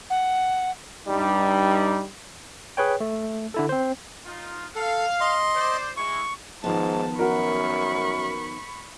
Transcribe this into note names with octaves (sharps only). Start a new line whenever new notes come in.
F#5
G2 G3 D#4
G#4 B4 C#5 G5
A3
D3 E4 A4
C4 C5
D#4 F4
A4 F5
D#5 C6
C5 D5
G#3 E4 C#6
G#2 D#3 F3 B3 A5
F#2 F#4 A#4 B5 C#6